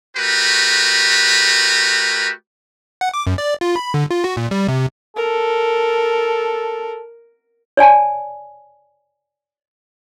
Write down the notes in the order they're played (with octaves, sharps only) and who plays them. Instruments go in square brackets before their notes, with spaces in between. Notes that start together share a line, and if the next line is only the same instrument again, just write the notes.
[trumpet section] A3 F#4 G4 A#4 B4
[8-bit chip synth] F#5
D6
F#2
D5
F4
B5
D3
F4
F#4
A#2
G3
C3
[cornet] A4 [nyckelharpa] A#4
[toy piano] C#5 D5 G#5 A5